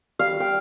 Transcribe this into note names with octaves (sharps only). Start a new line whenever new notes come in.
G3 F5
G5